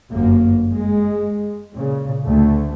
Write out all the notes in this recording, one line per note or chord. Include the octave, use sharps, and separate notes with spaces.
G1 F#2 A#3
G#3
A#2 C#3
D2 A3